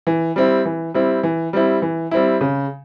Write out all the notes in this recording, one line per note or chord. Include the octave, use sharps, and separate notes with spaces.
E3
G3 C4 E4
E3
G3 C4 E4
E3
G3 C4 E4
E3
G3 C4 E4
C#3